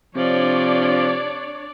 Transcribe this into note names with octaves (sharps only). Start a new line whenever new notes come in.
C3 F3 D4 C#5 D5